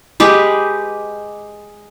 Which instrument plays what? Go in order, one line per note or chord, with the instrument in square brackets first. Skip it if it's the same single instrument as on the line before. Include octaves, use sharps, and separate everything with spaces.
[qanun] G#3 G4 B4